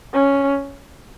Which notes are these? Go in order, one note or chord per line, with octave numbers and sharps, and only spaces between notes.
C#4